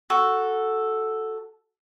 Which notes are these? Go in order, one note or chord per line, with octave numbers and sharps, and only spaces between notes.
F#4 A4